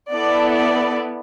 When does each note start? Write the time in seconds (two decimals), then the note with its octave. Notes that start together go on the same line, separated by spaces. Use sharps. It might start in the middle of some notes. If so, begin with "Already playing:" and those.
0.12 B3 E4 A4 D5
0.54 D5